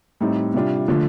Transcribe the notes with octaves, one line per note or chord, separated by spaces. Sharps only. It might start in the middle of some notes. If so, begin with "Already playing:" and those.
A2 G3 C4 D#4
C3 G3 D4 F4
D3 F3 A3 D4 F4